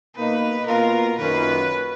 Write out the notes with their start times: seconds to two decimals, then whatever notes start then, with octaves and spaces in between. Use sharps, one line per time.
0.15 B2 A#3 D#4 B4
0.66 B2 A#3 F4 A#4
1.18 F#2 D#3 A#3 C#4 F4 B4